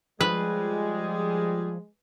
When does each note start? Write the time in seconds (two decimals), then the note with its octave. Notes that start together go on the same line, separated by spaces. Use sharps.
0.21 F3 G3 G#3 G#4 B4